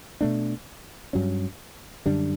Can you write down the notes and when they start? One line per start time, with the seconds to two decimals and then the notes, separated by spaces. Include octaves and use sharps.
0.21 B2 A3 D4
1.13 G2 F#3 C#4
2.06 F#2 D3 G3 D4